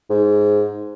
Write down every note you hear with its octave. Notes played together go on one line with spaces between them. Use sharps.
G#2